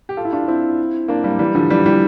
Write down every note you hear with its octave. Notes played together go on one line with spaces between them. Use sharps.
G4
F4 A4
E4
D4 F4
C4 E4
A#3 D4
G3 A#3
E3 G3
D3 F3
E3 G3
E3 G3